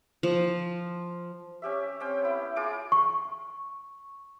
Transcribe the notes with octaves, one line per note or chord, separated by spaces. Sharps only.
F3
C#4 G4 E5
C4 C#4 G5
B3 E4
F4 G#4 D6
C#6